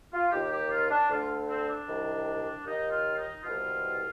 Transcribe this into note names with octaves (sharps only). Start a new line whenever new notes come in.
F4
D#2 D#3 G4
G4
F4
D4
D2 D3 F4
C4
D4
C2 C3 D#3
D#2 D#3 D#4
F4
D#4
C2 B2 F4